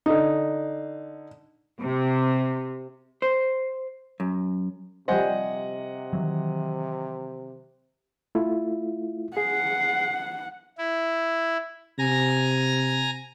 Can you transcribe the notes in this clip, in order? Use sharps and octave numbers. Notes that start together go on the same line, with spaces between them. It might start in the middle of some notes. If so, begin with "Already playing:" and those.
D3 D#4
C3
C5
F#2
C3 F3 G3 C5 D#5 F#5 G#5
D#3 E3 F#3
A3 E4 F4
G#4 F#5 C7
E4
C3 G#5 A#5 A#6